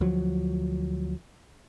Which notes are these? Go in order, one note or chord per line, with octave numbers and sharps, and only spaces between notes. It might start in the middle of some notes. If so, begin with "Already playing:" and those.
D2 F3 F#3